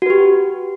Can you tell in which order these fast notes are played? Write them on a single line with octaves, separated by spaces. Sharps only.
F#4 B4 G4